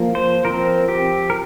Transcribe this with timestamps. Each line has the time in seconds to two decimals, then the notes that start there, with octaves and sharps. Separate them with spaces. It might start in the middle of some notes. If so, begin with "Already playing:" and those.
Already playing: F3 A#3
0.15 C5
0.45 F3 C4 A#4
0.89 G4
1.30 A#4